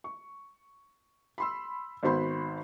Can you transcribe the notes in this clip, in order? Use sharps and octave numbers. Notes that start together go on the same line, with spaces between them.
C#6
B5 C6 E6
G#1 B3 F#4 C5 B5 C6